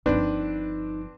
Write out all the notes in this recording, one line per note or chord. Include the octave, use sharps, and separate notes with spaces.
G1 F3 C4 D4 D#4 B4